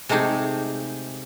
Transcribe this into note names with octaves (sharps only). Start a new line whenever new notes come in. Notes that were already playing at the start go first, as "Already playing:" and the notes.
C3 G#3 A3 D#4 G4 G#4